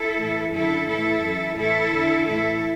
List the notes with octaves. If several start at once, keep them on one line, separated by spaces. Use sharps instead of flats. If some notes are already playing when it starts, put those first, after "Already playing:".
Already playing: E4 A4
A2 E3
F#2 D3 E4 A4
A2 E3 E4 A4
F#2 E3
A2 E3 E4 A4
E2 D3
A2 E3 E4 A4